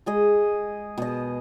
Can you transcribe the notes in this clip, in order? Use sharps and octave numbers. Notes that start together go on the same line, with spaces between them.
G#3 G#4 D#5
B2 D#5